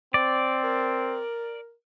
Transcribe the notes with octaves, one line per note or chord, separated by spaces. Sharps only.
C4 D5
A#4